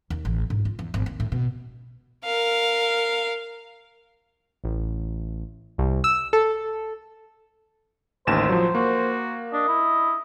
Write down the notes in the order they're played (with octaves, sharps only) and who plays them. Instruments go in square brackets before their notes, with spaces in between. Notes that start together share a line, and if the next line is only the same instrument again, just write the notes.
[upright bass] D#2
A1
G#2
F4
E2
G#1
D#2
A2
B2
[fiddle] A#4 F5
[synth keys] A1
C2
E6
A4
[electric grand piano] A1 D#2 E7 [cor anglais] C5
[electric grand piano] F3 F#3
[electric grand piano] A#3 [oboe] F#4
[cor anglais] D4 [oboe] D#5
[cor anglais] E4